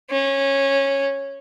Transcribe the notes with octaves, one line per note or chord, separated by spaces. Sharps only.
C#4